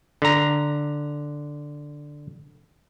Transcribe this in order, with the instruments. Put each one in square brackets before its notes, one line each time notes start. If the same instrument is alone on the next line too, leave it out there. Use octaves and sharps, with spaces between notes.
[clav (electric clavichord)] D3 A#5